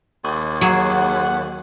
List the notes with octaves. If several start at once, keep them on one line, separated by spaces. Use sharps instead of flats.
D#2
F#3 G#4 F#5